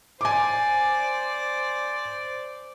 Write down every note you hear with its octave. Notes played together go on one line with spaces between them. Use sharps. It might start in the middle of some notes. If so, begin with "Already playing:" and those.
C5 D5 G#5 D6